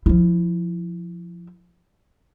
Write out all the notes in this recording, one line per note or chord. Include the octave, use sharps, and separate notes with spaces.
F3 E4